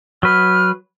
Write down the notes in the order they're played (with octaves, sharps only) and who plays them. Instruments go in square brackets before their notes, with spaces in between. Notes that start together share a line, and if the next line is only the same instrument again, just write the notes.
[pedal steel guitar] F#3 B4 [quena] F6